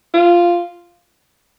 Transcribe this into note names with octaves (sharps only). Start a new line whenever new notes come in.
F4